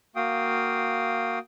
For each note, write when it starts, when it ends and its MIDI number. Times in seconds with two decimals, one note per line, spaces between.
0.16 1.39 58
0.16 1.39 66
0.16 1.39 77
0.16 1.39 79
0.16 1.39 87